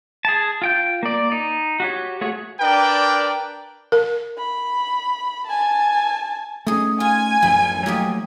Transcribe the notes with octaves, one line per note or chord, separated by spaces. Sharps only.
G#4 A5
F4 G5 G6
A#3 D5
D#4
F#4 G4 C#5
A3 F#4 G#4 C#5
D4 A#4 B4 D5 G5
A#4
B5
G#5 A5
A3 C#4 D#4 G#4
F4 G#5
A1 F#2 F3 E4
F3 F#3 A3 A#3 D#4 G4